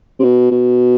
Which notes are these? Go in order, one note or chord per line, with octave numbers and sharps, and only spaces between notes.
C3
B2
B2